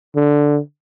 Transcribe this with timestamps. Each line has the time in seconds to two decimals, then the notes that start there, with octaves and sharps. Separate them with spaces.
0.16 D3